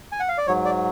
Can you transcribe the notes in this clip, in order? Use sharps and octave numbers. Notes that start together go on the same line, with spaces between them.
G#5
F#5
F5
D5
G#2 F#3 C#5
D5